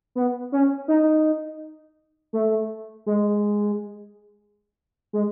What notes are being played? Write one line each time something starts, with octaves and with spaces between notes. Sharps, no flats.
B3
C#4
D#4
A3
G#3
G#3